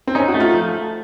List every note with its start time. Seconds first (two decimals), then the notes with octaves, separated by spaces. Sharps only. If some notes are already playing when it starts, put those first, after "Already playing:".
0.07 C4
0.15 C#4 D#4
0.28 F#4
0.34 A3
0.40 F4
0.54 F3